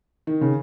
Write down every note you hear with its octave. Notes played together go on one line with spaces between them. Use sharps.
D#3
C#3